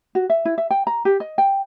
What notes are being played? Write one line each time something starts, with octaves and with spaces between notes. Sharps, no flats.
F#4
E5
E4
E5
G5
A#5
G4
D#5
G5